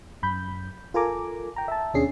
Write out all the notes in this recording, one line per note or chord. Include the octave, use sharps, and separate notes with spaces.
F#2 B5 G6
F4 A4 A#4 G#5 A#5 D6
G5 A#5
E5 A5
D#2 B2 C#4 D4 G#4 C7